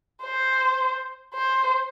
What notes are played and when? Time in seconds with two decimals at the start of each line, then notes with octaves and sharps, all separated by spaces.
0.23 C5
1.34 C5